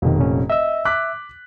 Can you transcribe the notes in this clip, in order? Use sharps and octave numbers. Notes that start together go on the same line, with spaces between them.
F1 F2 B2 D#3
A#2 C#4
D#5 E5 E6
D6 F#6 B6